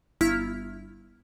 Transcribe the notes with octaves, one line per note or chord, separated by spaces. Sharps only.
G1 E4 F6 B6